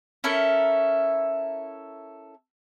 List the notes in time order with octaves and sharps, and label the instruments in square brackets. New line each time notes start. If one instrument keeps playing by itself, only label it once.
[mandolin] C#4 E4 A4 A#4